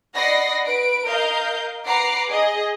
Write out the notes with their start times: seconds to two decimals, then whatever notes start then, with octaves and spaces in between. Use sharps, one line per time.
0.14 D5 D#5 F#5 B5 A#6 C7
0.65 B4 D7
1.05 A#4 D#5 F5 G6
1.86 B4 F#5 A#5 D6 C7
2.28 G#4 D#5